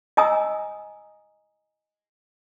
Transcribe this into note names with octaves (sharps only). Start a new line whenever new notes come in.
D#5 G#5 A#5 D#6 E6